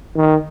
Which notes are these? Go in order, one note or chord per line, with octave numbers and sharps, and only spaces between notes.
D#3